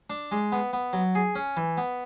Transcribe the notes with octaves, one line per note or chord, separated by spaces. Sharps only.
D4
G#3
B3
B3
F#3
G#4
C#4
E3
B3